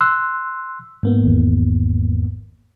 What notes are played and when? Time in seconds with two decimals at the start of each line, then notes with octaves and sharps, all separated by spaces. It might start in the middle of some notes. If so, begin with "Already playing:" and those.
0.01 C6 E6 F#6
1.03 G#2 A#3 B3
1.23 G#1 E2